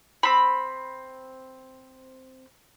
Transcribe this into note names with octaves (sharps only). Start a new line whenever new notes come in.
C4 B5